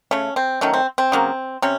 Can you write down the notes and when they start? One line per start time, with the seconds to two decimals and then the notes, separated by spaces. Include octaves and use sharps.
0.11 C#3 A3 C#4
0.36 C4
0.61 D#3 F#3 A3 C#4
0.74 C4
0.98 C4
1.12 C#3 F#3 A#3
1.62 C3 C#4